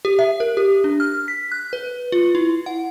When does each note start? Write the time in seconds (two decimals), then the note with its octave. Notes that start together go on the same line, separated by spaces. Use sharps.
0.05 G4
0.19 E5
0.40 A#4
0.57 G4
0.84 D4
1.00 F6
1.28 B6
1.52 F#6
1.73 B4
2.12 F4
2.35 E4
2.66 F#5